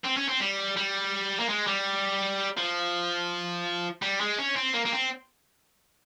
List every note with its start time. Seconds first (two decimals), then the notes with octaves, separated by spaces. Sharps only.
0.04 C4
0.17 C#4
0.28 C4
0.40 G3
0.77 G3
1.39 A#3
1.48 G#3
1.67 G3
2.57 F3
4.02 G3
4.20 G#3
4.39 C#4
4.56 C4
4.74 A#3
4.85 A#3
4.92 C4